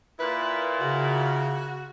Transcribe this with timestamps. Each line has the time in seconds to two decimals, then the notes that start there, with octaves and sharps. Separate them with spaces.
0.20 A#2 E4 B4
0.81 C#3 F#4